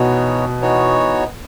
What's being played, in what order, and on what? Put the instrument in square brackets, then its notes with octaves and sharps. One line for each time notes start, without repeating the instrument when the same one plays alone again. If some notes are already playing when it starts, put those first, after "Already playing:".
Already playing: [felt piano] B2 [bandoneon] E3 B3 D#4 F#4 C#5
[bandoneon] E3 B3 D#4 F#4 C#5